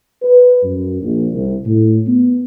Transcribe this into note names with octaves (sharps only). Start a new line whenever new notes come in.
B4
F#2
A#1
C2
A2
B3